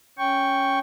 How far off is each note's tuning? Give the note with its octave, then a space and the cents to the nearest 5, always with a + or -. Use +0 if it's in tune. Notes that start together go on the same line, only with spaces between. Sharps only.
C#4 +0 G5 +0 C#6 +0